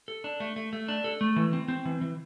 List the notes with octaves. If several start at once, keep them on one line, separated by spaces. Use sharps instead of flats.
A4
D4
A3
A3
A3
D4
A4
A3
E3
C4
C4
E3
E3